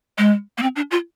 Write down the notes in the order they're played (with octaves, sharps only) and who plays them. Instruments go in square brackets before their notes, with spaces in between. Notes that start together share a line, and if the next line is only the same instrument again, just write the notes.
[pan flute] G#3
A#3
C4
D4
F4